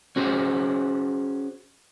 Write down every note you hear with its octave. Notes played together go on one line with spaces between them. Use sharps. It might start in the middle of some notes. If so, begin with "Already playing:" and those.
C#4 F#4 G#4 C5